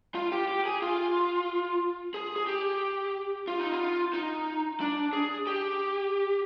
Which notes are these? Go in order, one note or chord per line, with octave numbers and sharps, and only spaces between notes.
F4
G4
G4
G#4
F4
G#4
G#4
G4
F4
D#4
F4
D#4
D4
G#4
G4